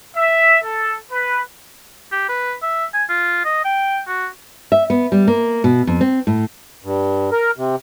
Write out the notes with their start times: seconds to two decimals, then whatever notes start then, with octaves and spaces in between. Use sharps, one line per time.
0.16 E5
0.63 A4
1.12 B4
2.12 G4
2.29 B4
2.63 E5
2.94 G#5
3.09 F4
3.45 D#5
3.65 G5
4.08 F#4
4.72 E5
4.90 B3
5.12 G3
5.28 A#3
5.64 B2
5.87 F2
6.01 C4
6.27 A2
6.84 G2
7.32 A#4
7.58 C3